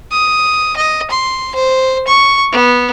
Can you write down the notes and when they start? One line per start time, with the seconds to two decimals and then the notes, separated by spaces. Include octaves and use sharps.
0.11 D#6
0.76 D#5
1.10 C6
1.55 C5
2.07 C#6
2.52 B3